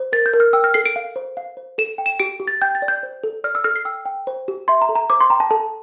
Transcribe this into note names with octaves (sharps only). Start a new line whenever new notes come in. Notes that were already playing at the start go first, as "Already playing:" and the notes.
Already playing: C5
A#4 A6
G6
A#4
F6
G5 E6
F6
A4 C7
D7
F5
C5
F5
C5
A4 E7
G5
E7
G4 D7
G4
A6
G5 G6
A6
D5
G6
C5
A4
D5 F6
E6
A4 F6
C7
G5 E6
G5
C5
G4
E5 C6
A#5
A4
A#5
C5 D6
C6
G5 A#5
A5
A4 A5